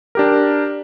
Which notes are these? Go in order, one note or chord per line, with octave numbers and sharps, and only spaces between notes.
D4 G4 A#4